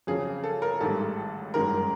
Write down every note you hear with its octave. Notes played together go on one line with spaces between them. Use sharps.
F2 C#3 F#3 G#4
A4
A#4
A1 G#2 D#3 G3 A4
G1 F#2 D#3 G#3 A#4